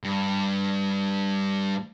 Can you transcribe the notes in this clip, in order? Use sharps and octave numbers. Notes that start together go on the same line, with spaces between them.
G2